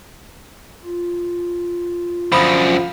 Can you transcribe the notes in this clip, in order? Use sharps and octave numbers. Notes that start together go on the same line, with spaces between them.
F4
F#2 D3 F3 B5 D#6 B6